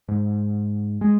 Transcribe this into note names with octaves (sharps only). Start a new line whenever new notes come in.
G#2
G#3